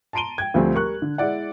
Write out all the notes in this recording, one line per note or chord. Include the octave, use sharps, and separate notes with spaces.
A5 A#5 C6 D7 D#7 G7
G5 G#6
D2 F3 G3 A3 C4
G3 A#4 C#6 F#6
D3
G#3 E4 D5 F#5